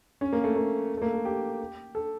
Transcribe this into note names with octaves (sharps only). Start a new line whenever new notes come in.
C#4
A#3
A3
A#3
A3
A#3
A3
G4
A4